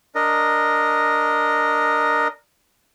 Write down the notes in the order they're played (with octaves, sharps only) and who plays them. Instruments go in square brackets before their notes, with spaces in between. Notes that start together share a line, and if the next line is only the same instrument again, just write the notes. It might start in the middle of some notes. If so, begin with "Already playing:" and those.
[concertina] D4 A#4 D#5